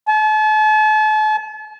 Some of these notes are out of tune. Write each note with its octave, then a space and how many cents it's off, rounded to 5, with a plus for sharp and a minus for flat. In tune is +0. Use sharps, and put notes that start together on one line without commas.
A5 -40